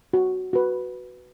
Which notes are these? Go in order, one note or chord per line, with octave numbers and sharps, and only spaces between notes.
F#4
F#4 B4